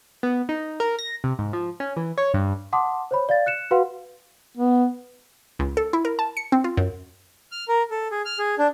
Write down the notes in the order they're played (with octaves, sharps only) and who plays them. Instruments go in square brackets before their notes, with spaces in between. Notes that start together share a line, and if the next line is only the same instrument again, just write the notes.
[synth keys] B3
D#4
A#4
A#6
C3
G#2
F3
C#4
E3
C#5
G2
[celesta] F#5 A5 C6 D6 D#6
C5 C#5 B5
D5 F5 A6
F#6 C#7 E7
F#4 B4 F5 F#5 C6
[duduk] B3
[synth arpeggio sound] C#2
A4
E4
A#4
A5
C#7
C4
F4
F#2
[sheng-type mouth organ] F6
A#4
A4
G#4
F6
G#4
D4